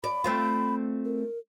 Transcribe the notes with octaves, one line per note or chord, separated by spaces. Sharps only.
D5 B5
A3 C4 F4
A#4